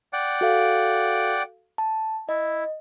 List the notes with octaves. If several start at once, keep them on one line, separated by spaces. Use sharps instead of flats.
D5 F#5 G5
F#4 A4 F5
A5
E4 D#5